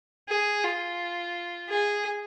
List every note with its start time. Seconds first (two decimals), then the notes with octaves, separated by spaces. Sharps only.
0.29 G#4
0.64 F4
1.69 G#4